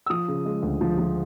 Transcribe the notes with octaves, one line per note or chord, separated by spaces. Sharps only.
E6
F3 D#6
C#3
G#3
D2
F3
F3